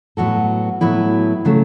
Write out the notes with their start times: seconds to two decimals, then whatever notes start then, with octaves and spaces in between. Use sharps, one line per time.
0.17 A2 F#3 B3 F#4 A4
0.81 A2 F#3 B3 E4 B4
1.45 C#3 F#3 A3